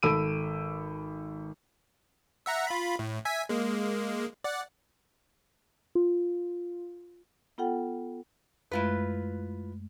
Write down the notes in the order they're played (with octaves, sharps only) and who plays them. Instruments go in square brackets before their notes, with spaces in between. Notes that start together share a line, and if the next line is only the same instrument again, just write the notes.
[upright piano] G#1 A4 B5 E6 D7 D#7
[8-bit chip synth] E5 F#5 A#5
F4 B5
A2
E5 G#5 B6
G#3 A#3
D5 F#5
[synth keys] F4
[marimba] B3 F4 A4 F#5 G5
[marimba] F#2 G#3 A3 [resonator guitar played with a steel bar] E4 F4 B4